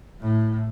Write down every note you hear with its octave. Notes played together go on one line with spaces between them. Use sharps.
A2